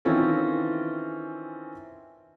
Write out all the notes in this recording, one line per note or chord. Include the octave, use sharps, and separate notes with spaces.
D#3 E3 C4 C#4 F4 A4